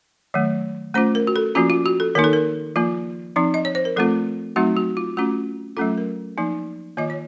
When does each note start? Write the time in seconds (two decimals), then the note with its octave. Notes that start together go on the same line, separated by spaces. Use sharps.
0.34 D#3 F#3 A3
0.94 A3 C#4 F4 C5
1.15 A#4
1.27 F#4
1.36 A4
1.55 F3 A#3 C#4 F4 F#4
1.70 F4
1.86 F#4
2.00 A4
2.15 D#3 A#3 D#4 A#4
2.24 A4
2.33 A#4
2.76 F3 A#3 F4
3.36 F3 C4 D#4
3.54 D#5
3.65 C#5
3.75 C5
3.85 A#4
3.97 F3 A3 C4 F4 A4
4.56 F#3 A3 C4 D#4 F#4
4.77 F#4
4.97 F4
5.17 A3 C#4 F4 F#4
5.77 F#3 A3 C#4 F4 A4
5.98 A#4
6.38 F3 A#3 D#4
6.97 D#3 A#3 F4 D#5
7.10 C#5